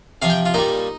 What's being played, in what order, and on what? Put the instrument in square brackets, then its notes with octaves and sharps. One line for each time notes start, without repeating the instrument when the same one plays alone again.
[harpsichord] C3 F3 F5
G5
F4
A#2 G3 D#4